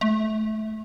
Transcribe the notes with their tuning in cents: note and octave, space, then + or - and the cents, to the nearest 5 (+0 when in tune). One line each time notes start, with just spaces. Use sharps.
A3 -20